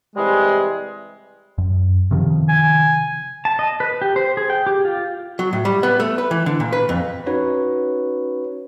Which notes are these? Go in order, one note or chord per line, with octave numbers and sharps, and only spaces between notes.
C3 E3 G3 G#3
F#2
C3 D#3 F3
G#5
A5
D#5
B4
G4
C5
G#4
G5
G4
F4
F#3
A2
G3
B3
A3
B4
E3
D3
A#2
B4
F2
C#4 D#4 F#4 B4 C#5